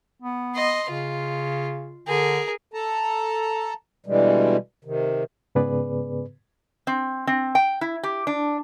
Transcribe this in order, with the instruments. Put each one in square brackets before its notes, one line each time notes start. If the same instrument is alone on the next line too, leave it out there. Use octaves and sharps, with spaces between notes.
[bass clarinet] B3
[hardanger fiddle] D#5 C6
[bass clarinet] C#3 [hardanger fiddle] F4
[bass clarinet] D3 [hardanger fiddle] G#4 A#4
[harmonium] A4 A5 A#5
B2 D3 E3 G3 G#3
C3 D#3
[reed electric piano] G#2 C#3 B3 G#4 B4 D5
[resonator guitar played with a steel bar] C4
C4
G5
E4
G4
D4